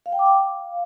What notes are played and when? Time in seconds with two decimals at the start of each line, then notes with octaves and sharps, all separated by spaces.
0.06 F5
0.12 G5
0.19 D6
0.26 F5